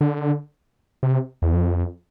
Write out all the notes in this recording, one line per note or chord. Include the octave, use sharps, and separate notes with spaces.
D3
C3
E2
F2